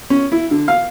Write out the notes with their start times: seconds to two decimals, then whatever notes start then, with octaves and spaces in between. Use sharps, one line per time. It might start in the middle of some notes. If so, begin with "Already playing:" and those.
0.10 C#4
0.32 E4
0.51 D3
0.68 F5